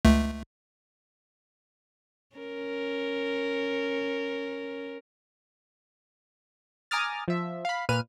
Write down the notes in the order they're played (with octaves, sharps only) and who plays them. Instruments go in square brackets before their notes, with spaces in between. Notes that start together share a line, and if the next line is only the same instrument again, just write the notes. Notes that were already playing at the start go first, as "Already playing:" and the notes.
[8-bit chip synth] C#2 A3
[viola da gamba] C#4 A#4
[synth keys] G#5 A#5 D6 D#6 F6 A6
F3 E5
F5 B5
A#2 B4 F6 D#7